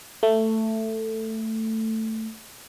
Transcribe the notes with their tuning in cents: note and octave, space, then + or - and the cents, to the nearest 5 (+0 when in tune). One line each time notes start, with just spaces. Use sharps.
A3 +10